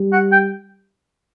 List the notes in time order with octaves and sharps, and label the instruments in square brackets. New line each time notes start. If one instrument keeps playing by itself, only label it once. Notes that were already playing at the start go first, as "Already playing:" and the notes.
Already playing: [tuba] G3
[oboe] F#5
G5